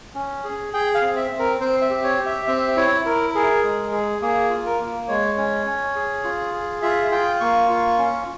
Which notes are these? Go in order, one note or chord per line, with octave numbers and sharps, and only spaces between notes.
C#4
G#4
G#4 G5
F5
C4
E5
C4
A#4
C4 C5
E5
G4
C#5
G4
E5
C4 E5
E4 C#5
E4 A#4
G#4 A#4
G#3
G#4
A#3 G#4
F4
A#4
A#3
G#3 C#5
C#4
C#4
G#4
F4
G#4
F4 E5
F4 G5
A#3 C#6
F4
C#4